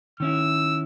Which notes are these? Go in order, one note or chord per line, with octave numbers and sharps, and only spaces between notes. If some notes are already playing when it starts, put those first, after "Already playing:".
D#3 C#4 E4 E6